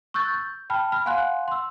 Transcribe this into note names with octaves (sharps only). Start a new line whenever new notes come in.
C#6 E6 F#6 G6 A6
G6
G5 A5 B5 F6
B5 F6
F5 F#5 G#5 C6 F#6
C6 E6